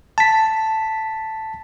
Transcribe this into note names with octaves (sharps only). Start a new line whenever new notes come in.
A5 B6